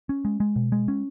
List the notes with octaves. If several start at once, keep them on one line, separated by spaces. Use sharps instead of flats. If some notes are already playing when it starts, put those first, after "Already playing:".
C#4
G#3
G#3
B2
G#3
C#4